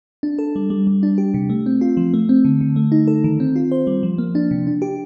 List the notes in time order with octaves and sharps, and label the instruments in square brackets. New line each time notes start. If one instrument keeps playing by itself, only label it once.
[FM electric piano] D4
A4
G3
G3
G3
D4
G4
C3
A3
C4
F4
F3
A3
C4
D3
D3
A3
D#4
A4
D#3
C4
F4
C5
G3
F3
A#3
D4
C3
D4
G4